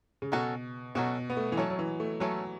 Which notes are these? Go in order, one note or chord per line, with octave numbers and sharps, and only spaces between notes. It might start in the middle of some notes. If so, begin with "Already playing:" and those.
C#3
B2 F#3 C#4 F#4 A4
B2 F#3 C#4 F#4 A4
B3
A3
E3
F#3 A3 C#4 A4 C#5
F#3
E3
A3
F#3 A3 C#4 A4 C#5